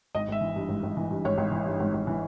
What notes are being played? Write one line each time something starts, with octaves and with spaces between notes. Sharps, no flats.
G#1 D#5
G#1 E5
E3
G2
G#1
G#1
E3
G2
G#1 C#5
G#1
E3
G2
G#1
G#1
E3